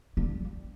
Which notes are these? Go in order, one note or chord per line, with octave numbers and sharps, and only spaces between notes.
G3